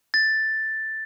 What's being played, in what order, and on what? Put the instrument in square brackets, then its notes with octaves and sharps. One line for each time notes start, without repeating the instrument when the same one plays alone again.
[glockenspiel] A6